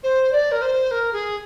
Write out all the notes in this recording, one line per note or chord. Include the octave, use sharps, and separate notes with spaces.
C5
D5
A#4
C5
A#4
G#4